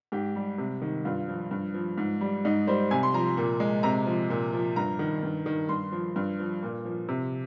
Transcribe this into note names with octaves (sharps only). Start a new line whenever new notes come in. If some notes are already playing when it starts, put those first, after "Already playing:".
G#2 G4
G3
C3
D#3
G2 F4
F3
G2
F3
G#2
G3
G#2 D#4
G3 C5
C3 G#5
C6
F3 A#5
A#2
G#3
C3 A#5
F3
A#2
F3
G2 A#5
D#3
G2
D#3
G2 C6
F3
G2
F3
A#2
F3
C3